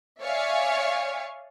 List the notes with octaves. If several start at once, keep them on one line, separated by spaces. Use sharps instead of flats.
C#5 D5 E5 F5 G#5 C#6